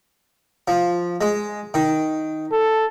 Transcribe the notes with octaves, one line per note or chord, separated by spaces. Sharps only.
F3
G#3
D#3
A4